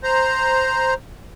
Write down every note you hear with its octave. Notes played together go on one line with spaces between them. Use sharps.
C5 A#5